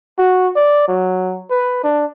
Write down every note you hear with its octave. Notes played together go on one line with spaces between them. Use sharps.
F#4
D5
F#3
B4
D4